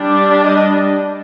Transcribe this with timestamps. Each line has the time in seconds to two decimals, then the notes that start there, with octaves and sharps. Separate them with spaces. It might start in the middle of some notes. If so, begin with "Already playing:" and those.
Already playing: G3 D4
0.43 D#5